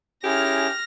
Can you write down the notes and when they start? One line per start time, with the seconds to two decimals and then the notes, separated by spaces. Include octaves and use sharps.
0.24 C#4 E4 G4 G#4 F6 A#6